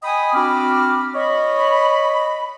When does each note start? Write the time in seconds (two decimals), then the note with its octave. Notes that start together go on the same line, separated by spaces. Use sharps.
0.03 D#5 G5 G#5 B5 D#6
0.34 C4 D4 F#4 B5 D6 F6
1.15 C#5 D#5 B5